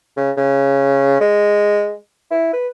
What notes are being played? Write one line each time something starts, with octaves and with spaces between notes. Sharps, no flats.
C#3
C#3
G#3
E4
B4